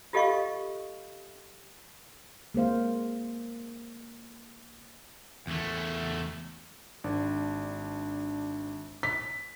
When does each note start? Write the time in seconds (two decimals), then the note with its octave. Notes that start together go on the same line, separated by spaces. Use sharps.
0.13 F4 G4 A4 D#5 F5 C#6
2.54 G#3 A#3 C5 F5
5.47 E2 A3
7.04 G#1 D4
9.03 B6